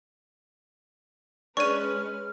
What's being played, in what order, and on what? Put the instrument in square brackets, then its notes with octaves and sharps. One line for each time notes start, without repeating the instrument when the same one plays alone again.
[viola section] G#3 C#4 B4 [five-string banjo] D4 C#5 [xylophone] C#6 D#7 [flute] F6